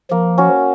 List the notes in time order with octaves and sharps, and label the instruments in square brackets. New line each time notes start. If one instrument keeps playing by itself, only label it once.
[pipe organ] F3 [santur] A#3
[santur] C#4 F#4